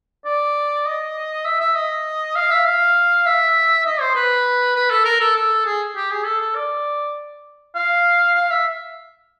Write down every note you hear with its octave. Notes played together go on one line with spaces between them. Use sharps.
D5
D#5
E5
E5
D#5
F5
E5
F5
E5
D#5
C5
B4
B4
A4
A#4
A4
A4
G#4
G4
G#4
A4
A4
D5
F5
F5
E5